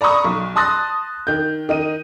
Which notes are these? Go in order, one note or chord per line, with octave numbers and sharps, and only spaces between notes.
D5 A#5 B5 C#6 D#6
B1
A5 C6 D#6 F#6 A6 A#6
D#3 G6
D#3 D#4 D#7